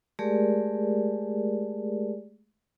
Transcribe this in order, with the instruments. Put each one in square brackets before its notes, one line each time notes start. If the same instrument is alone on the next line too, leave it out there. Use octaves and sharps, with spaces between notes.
[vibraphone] G#3 A3 G4 G#4 A#4 D5